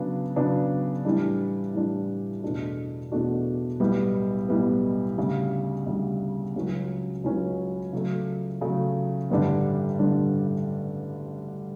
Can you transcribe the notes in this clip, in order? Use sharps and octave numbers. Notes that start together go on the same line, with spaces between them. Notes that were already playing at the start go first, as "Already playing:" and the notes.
Already playing: C#3 F#3 B3 D4
C#3 F#3 B3 D4
A2 E3 G3 D4
A2 E3 G3 D4
E2 B2 A3 D4 F#4
E2 B2 A3 D4 F#4
B1 A2 G3 B3
B1 A2 G3 B3
D2 C#3 G3
D2 C#3 G3
C#2 C#3 F#3 C#4 F#4
C#2 C#3 F#3 C#4 F#4
C#3 F#3 A3
C#3 F#3 A3
A1 G2 D3 G3 D4
A1 G2 D3 G3 D4